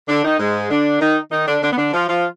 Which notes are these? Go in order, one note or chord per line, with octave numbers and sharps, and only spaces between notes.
D3 D4
D#3 D#4
G#2 G#3
D3 D4
D#3 D#4
D#3 D#4
D3 D4
D3 D4
B3
D3 D4
F3 F4
F3 F4